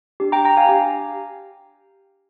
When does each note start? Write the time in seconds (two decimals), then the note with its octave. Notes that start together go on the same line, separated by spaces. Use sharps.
0.20 D4 G4
0.32 G5 A#5
0.45 G5 A#5
0.57 F5 G#5
0.69 D4 G4